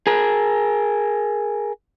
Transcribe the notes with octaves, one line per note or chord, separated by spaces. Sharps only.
G#4 A#4